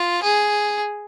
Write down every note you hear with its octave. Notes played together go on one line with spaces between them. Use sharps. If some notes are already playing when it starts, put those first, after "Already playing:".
Already playing: F4
G#4